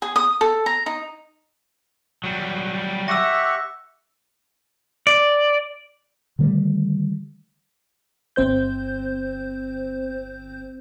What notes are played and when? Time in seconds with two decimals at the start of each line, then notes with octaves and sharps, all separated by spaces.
0.02 G#4
0.16 D#6
0.41 A4
0.66 A#5
0.86 D#4
2.24 F#3 G3
3.08 G4 E5 F#5 C#6 E6 A#6
5.07 D5
6.39 D3 D#3 G3 A3
8.36 G1 C4 C5 G6